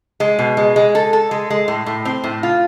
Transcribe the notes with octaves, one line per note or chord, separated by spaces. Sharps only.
G#3
B2
G#3
G#3
A4
A4
G#3
G#3
A2
A2
C4
A2
F4